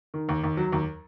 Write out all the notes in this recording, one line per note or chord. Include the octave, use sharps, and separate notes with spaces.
D#3
D#2
D#2
F#3
D#2